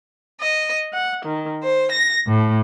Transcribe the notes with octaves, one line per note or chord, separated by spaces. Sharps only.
D#5
F#5
D#3
C5
A#6
A2